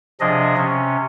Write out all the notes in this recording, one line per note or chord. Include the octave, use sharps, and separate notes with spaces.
C3 F3 D4 G#4 D#5
C3 C#4